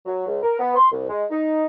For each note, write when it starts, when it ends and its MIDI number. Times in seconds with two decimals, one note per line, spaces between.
0.06 0.26 54
0.27 0.38 37
0.43 0.56 70
0.59 0.75 59
0.76 0.90 84
0.92 1.04 36
1.09 1.24 56
1.30 1.66 63